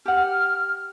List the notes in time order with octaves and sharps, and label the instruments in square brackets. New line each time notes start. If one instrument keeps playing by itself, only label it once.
[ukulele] G4 F#5 [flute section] F6